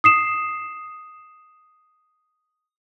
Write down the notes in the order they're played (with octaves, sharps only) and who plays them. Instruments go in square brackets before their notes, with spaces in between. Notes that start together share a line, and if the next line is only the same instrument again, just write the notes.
[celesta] D#6 C7 E7